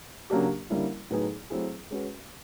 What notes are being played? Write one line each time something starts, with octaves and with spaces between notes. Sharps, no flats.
C#3 F#3 A#3 D4 G4
D3 G3 A#3 C#4 E4
A2 F#3 B3 D#4 G#4
F#3 A3 C4 E4 G#4
G#3 C#4 F#4 B4